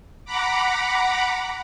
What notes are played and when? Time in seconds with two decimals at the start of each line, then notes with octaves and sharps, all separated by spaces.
0.25 F#5 A#5 B5 D6